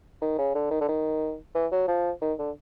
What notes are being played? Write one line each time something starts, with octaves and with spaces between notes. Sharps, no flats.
D#3
C#3
D3
D#3
D3
D#3
E3
F#3
F3
D#3
D3